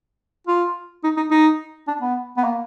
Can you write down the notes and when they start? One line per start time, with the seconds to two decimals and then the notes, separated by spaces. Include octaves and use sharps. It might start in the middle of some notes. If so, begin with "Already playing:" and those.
0.47 F4
1.04 D#4
1.17 D#4
1.31 D#4
1.88 D4
2.01 B3
2.37 B3
2.44 A#3